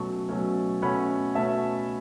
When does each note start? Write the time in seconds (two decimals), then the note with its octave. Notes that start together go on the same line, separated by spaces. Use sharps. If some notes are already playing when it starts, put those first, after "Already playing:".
Already playing: B2 F#3 A3 C#4 A5 C#6
0.29 B2 F#3 A3 C#4
0.82 B2 A3 C#4 F#5 B5
1.35 B2 A3 C#4 E5 A5